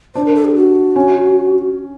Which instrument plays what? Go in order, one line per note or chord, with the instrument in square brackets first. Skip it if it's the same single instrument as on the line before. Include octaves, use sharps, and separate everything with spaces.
[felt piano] D4 [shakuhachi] C5
[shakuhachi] A#4
A4
G4
F#4
[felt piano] C#4